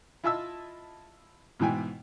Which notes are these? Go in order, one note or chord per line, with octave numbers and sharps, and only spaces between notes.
E4 F4 D#5 E5 A5 E6
G#2 B2 E3 G5 G#5